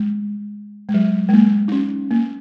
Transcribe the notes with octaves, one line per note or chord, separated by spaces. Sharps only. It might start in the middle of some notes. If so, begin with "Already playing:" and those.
Already playing: G#3
G#3
F#3
G#3
A#3
D#4
C#4
A#3